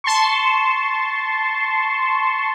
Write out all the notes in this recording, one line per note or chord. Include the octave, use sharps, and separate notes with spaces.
A5 C6 C#6